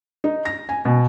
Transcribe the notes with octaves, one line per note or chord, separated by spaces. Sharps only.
D#4
A#6
G#5
B2